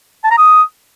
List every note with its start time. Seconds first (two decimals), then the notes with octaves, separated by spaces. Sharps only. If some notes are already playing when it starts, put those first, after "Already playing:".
0.24 A5
0.31 A#5
0.38 D#6